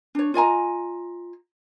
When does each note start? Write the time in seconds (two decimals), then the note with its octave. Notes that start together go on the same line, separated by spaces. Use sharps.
0.15 D4 C#5
0.34 F4 D#5 G#5 A#5